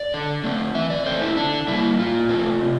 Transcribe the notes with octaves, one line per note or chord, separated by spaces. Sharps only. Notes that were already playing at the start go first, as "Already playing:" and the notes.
Already playing: D5
D3
A3 C4
E3 E5
D5
A3 C4 C5
E4
D3 D4
G3 A#3 E4
A#2 F4
A3 C4
C3